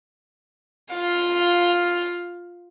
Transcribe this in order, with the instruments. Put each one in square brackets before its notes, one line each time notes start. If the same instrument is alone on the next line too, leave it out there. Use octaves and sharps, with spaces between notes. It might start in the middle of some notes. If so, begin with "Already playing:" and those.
[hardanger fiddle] F4 F5